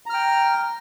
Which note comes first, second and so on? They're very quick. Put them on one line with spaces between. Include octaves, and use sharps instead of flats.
A#5 F6 G5